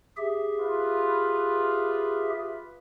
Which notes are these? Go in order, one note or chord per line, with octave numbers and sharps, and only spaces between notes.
G4 G#4 E5
F4 B4